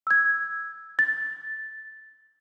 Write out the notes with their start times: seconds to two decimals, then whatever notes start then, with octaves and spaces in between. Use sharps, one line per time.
0.07 E6 G#6
0.99 A6